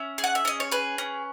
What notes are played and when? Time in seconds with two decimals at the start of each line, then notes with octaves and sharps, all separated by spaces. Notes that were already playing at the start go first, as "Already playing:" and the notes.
Already playing: C#4 E5
0.18 G#4
0.24 F#5
0.35 E5
0.45 C#4 D#5
0.60 C#5
0.71 G#4 B4
0.98 C#4